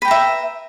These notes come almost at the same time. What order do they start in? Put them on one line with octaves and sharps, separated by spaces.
B4 G5 A#5 E5